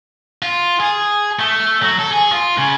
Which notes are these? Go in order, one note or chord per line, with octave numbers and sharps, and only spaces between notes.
F4
G#4
A3
F#3
A4
G#4
F4
C#3